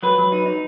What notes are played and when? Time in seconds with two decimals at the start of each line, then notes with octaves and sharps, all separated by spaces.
0.03 F#3 B4
0.18 F#3
0.32 D#4
0.46 D#4